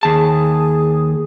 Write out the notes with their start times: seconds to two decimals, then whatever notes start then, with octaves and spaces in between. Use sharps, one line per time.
0.03 D#2 G#4 A5